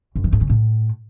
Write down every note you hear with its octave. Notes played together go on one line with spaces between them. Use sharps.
F#2
E3
G#2
C#3
A2